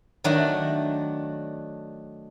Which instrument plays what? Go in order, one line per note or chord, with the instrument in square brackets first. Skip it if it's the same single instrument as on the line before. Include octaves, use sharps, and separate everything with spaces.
[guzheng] D#3 F#3 A3 D4 F#4